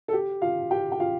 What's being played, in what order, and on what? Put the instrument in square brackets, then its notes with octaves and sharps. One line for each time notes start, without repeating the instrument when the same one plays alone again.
[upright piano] A4
G4
F4 F5
G4 G5
G5
F4 F5